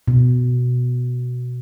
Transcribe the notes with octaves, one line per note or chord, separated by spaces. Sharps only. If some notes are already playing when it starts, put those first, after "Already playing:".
B2